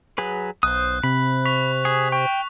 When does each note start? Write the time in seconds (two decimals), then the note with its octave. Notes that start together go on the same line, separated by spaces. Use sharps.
0.18 F#3 G#4 B4
0.63 B1 C5 D#6 F#6
1.03 C3 B5
1.45 C#6 B6 F7
1.85 G#4
2.12 G5 C#6